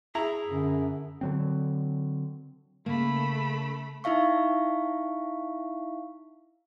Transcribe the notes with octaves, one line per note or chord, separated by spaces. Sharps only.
E4 G#4 A#5
F#2 D3
D3 F#3 C4
C#3 A3 A#3 B5 E7
D#4 E4 E5 F5 C#6